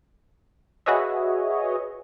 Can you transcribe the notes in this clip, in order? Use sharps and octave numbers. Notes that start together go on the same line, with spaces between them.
F#4 G#4 B4 C#5 D#5 E5